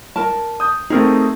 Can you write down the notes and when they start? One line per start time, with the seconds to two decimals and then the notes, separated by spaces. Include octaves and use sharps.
0.16 A#4 A5
0.60 D#6 G6
0.90 A3 C4 D#4 G#4 A#4